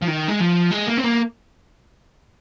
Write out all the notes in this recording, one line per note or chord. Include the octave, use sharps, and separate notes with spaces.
F3
D#3
G#3
F3
G#3
A#3
C4
A#3